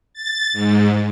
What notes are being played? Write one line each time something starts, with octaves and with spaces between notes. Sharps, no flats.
A6
G#2